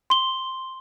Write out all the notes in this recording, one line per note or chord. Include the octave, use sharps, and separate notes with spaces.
C6 G7